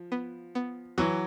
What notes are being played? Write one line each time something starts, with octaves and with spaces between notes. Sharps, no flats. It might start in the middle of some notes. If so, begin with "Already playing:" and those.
Already playing: F3
B3
B3
E3 F#3 F#4